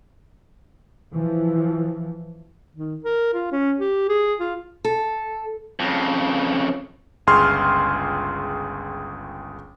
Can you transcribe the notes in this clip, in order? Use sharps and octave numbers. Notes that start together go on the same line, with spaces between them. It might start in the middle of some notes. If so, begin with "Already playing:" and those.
E3 F3
D#3
A#4
F4
C#4
G4
G#4
F4
A4
F2 C#3
G1 C#2 G#4 C6 F6